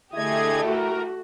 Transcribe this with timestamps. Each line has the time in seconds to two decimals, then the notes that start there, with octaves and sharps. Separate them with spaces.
0.14 D3 A3 E4 G4 G#4 D#5 G#6
0.66 F#4 A#4